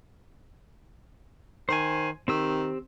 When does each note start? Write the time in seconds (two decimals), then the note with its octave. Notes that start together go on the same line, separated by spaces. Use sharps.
1.69 D#3 C5 G#5
2.28 D#3 C4 G4 E6